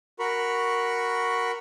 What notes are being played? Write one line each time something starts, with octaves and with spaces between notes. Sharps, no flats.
F#4 A#4 B5 C#6